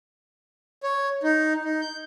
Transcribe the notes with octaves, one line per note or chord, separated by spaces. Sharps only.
C#5
D#4
D#4
G6